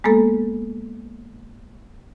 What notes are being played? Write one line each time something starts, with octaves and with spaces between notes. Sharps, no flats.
G#3 A#3 B3 A4